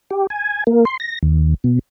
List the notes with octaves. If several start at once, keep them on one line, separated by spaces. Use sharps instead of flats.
G4
G#5
A#3
C6
A#6
D#2
B2